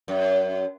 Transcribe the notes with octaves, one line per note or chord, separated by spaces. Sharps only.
F#2